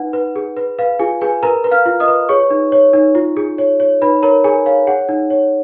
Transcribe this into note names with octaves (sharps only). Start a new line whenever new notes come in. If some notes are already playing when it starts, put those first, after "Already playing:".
Already playing: D#4 B4 F#5
B4
G#4
B4
B4 F5
F4 G#4 G#5
G#4 B4 G#5
A#4 B4 A#5
B4
F5 F6
F4
D#5 D#6
B4
G#4 C#5 C#6
D#4
C#5
D#4
F4
G#4
C#5
C#5
D#4 B4 B5
A#4 C#5 A#5
G#4 A#4 G#5
C#5 F5
G#4 F#5
D#4
C#5